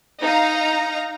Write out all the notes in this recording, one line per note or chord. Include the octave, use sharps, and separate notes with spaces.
D#4 F5 A#5